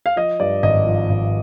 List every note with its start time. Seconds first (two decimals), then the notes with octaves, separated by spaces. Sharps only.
0.06 F5
0.16 F3 D#5
0.40 G2 D5
0.63 G#1 D#5
0.86 F3
1.09 G#1